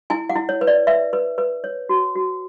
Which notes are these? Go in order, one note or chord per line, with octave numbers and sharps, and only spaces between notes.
E4 G#5
F#5
E4
C#5
B4
D5
B4 E5
B4
B4
C#5
F#4
F#4